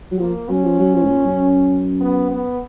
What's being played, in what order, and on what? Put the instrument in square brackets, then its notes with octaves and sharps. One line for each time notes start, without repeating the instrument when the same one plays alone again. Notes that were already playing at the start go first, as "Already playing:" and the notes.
[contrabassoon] F#3
[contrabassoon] F3 [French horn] A#3
[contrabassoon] F#3 [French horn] C#4
[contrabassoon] F3
F#3
F3
G#2
A#2
F#2
[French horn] B3
B3